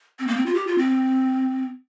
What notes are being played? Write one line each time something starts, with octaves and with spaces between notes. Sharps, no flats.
C4
A#3
C4
F4
G4
F4
C4